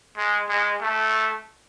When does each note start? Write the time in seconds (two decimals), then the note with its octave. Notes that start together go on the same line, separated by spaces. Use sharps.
0.17 G#3
0.49 G#3
0.81 A3